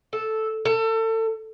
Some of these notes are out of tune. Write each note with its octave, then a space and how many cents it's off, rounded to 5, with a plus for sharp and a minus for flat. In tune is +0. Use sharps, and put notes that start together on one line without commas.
A4 -5
A4 +30